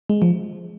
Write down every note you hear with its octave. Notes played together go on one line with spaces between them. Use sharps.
G#3
F3